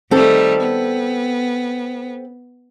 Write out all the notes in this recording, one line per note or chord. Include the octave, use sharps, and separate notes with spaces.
D#3 G3 A3 C4 A4
B3